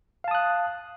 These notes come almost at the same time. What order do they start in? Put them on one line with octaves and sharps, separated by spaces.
F5 A5 D#6 F#6